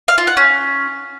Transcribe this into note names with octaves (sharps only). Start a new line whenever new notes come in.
F5
F4
F#5
C#4